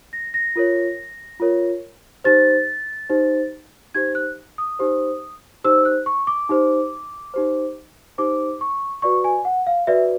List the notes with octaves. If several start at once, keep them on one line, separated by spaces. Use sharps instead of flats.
A#6
A#6
F4 A#4 C#5
F4 A#4 C#5
D#4 G4 C5 A6
D#4 G4 C5
D#4 G4 C5 G#6
F#6
D#6
D#4 G4 C5
D#4 G4 C5 E6
F#6
C#6
D6
D#4 G4 C5
D#4 G4 C5
D#4 G4 C5 D6
C#6
F#4 B4 D5 C#6
G#5
F#5
F5
F#4 B4 D5 E5